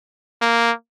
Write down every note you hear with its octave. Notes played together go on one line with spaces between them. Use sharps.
A#3